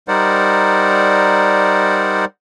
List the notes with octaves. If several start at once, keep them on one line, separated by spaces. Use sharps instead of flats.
G3 D#4 A#4 C5 D5 F#5